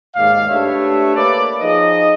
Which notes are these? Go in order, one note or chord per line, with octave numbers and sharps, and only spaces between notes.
D#2 G#2 G#3 D5 F5
A3 D4 G4 B4 C#5 E5
A#3 B4 C#5 D5
F3 D#4 G#4 D#5